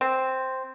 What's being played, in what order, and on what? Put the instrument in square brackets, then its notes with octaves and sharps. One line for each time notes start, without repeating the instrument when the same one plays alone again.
[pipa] C4